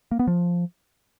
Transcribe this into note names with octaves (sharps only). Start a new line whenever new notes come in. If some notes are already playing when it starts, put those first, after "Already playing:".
A#3
B3
F3